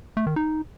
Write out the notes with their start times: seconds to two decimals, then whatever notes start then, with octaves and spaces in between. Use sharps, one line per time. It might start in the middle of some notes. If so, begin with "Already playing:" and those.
0.17 A3
0.27 D#3
0.36 D#4